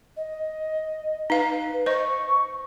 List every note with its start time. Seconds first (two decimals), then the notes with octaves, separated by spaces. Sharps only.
0.16 D#5
1.30 D#4 B4 F5
1.86 C5 D#5 C#6